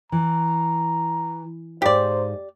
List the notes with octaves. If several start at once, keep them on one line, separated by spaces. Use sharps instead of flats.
E3 A#5
G#2 D#4 G4 C5 D5 F5